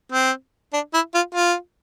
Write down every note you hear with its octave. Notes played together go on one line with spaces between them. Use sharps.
C4
D4
E4
F4
F4